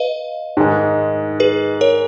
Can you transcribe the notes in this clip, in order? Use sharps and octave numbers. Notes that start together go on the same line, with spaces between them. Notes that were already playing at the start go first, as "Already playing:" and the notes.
Already playing: B4 D#5 F5
G#2 D#3 G#3
G#4 B4
A#4 C#5